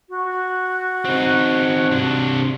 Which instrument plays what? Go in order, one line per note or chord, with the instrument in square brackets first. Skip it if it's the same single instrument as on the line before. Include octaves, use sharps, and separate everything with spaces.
[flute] F#4
[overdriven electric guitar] C4 D#4
C3 D4